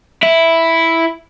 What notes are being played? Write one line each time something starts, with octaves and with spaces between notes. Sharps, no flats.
E4